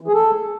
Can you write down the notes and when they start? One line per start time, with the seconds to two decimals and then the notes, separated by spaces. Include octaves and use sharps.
0.01 E3
0.08 G#4
0.14 A4